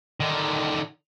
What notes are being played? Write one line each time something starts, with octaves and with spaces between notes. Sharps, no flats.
D3 D#3